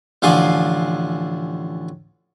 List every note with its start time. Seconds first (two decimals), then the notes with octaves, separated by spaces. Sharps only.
0.22 A1 D3 F3 D4 G#5 C6